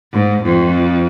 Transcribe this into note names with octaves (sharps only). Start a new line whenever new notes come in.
G#2
F2